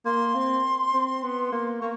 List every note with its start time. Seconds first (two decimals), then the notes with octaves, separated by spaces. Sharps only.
0.05 A#3 C6
0.34 C4
0.93 C4
1.23 B3
1.52 A#3
1.81 A#3 C#6